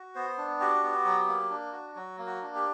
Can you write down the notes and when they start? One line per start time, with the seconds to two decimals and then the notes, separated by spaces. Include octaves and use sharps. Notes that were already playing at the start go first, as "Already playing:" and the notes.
Already playing: F#4
0.15 B3 C5
0.38 D4
0.60 F#4 G4
0.83 B3
1.05 F#3
1.28 A#3
1.50 D4
1.72 F#4
1.95 F#3 F#4
2.18 A#3
2.26 F#4
2.41 D4
2.55 G4